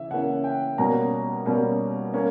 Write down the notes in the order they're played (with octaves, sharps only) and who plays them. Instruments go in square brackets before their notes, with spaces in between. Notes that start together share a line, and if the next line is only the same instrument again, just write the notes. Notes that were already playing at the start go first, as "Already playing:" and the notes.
Already playing: [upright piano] C#3 E3 E5
C#3 E3 A#3 C#4 F#5
G5
B2 G3 A#3 C#4 A#5
B2 G3 A#3 C#4
A#3 C#4